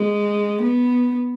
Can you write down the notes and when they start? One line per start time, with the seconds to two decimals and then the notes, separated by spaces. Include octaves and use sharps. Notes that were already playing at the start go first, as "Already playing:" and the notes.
Already playing: G#3
0.62 B3